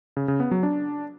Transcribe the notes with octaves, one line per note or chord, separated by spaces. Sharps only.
C#3
C#3
B3
F#3
D4